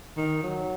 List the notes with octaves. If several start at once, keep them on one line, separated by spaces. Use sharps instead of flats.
D#3
F#3